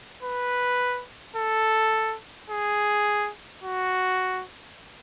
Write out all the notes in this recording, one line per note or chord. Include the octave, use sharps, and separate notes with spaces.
B4
A4
G#4
F#4